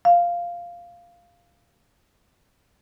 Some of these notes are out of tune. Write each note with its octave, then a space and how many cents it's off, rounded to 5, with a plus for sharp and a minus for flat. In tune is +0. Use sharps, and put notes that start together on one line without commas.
F5 -5